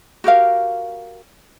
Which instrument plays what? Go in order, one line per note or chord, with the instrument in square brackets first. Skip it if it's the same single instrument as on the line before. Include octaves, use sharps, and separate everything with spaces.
[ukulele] F#4 G4 A#4 F5